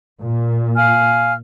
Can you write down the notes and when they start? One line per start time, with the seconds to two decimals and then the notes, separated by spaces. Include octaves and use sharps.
0.23 A#2
0.77 F5 G#5 F6